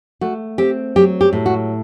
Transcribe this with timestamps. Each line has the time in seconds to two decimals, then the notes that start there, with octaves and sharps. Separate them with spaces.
0.21 A3 F#4
0.58 C4 G4
0.96 F#3 G4
1.21 G4
1.33 A2
1.46 F#4